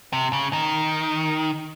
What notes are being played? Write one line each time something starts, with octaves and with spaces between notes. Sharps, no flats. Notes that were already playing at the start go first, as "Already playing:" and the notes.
C3
C#3
D#3